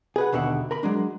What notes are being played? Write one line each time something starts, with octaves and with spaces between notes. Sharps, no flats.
G#4 B4 F#5
D#2 B2 D3 E5 F#5
A#4 B5
F#3 G#3 D4